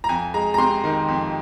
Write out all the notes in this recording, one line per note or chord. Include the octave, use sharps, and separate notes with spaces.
A#5
F2 G#5
G#3 A#5
A#5
C3 C6
D#3
F2